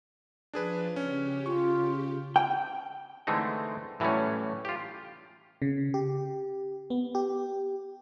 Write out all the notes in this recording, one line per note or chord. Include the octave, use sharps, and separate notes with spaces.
F3 D4 F4 G#4 B4
C#3 C#4 G4
F4 C#6
G5
D3 E3 G#3 A3 C4 D#4
A2 E3 F#3 G3 A3 C#4
F4 G4
C#3
G4
B3
G4